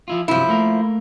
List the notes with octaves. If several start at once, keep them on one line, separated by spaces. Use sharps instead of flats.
F3 E4 F4
G2 C3 F3 F#3 E4
A3 A#3 A#4